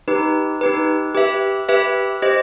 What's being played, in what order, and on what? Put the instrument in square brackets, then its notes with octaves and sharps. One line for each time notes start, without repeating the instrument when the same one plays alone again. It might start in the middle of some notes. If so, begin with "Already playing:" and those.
[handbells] D#4 G4 B4
D#4 G4 B4
G4 B4 E5
G4 B4 E5
G4 C5 D#5